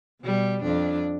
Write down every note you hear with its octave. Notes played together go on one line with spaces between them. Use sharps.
B2 G3
F2 D4